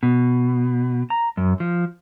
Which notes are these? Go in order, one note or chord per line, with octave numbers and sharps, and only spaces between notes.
B2
A#5
F#2
F3